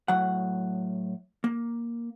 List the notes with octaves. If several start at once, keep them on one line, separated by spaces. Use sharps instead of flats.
A2 F#3 F#5
A#3